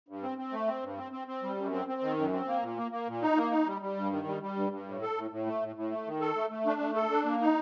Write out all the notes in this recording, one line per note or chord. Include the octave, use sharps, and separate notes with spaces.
G2
C4
C4
A3
C4
G2
C4
C4
C4
G3
F#2
C4
C4
D#3
F#2
C4
A#3
A#2
A#3
A#3
A#2
D#4
A#3
D#4
G3
G3
G2
D#3
G3
G3
G2
G2
A2
A4
A2
A2
A3
A2
A2
A3
D#3
A4
A3
A3
D4
A3
A4
D4
A#3
D#4